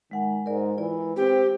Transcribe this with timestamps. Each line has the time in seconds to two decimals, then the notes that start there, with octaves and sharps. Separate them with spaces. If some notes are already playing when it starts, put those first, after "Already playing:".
0.11 D#3 G#3 F#5 G#5
0.46 G#2 A#4 D5
0.78 E3 F4 D5
1.16 C4 G4